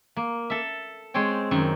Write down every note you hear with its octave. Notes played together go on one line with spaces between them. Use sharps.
A#3
A4 E5
G#3 C4 G#4 C#5 G5
F#2 D#3